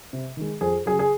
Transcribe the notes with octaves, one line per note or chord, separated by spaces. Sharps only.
C3
D#3 G#3
F2 G#4
C#3 F#3 G#4
G#4